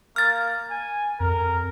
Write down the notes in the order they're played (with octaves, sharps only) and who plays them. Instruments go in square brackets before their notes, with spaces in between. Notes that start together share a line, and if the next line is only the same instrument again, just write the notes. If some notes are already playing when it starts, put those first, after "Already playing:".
[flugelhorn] A#3 [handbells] F6 A6
[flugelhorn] G#5
[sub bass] F2 [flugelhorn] A#4